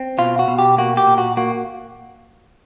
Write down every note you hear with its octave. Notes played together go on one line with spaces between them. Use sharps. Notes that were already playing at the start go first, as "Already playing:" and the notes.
Already playing: C4
B2 F4
F#4
B2
G4
A#3 F#4
G4
A#2
F#4
A#3 F#4